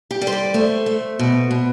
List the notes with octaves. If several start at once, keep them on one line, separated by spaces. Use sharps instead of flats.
G4
G3
C5
D5
A3 C5
A3
B2
B2